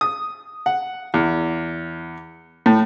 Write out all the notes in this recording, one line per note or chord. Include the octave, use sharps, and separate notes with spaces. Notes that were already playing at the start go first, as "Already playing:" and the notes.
D#6
F#5
E2
A2